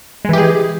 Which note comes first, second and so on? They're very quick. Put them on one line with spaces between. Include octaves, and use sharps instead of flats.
G#3 E3 G4 G#4